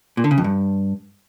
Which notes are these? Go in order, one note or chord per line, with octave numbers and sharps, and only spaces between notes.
A#2
D3
C#3
F2
G2